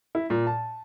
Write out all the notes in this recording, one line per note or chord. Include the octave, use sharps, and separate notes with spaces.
E4
A#2
A5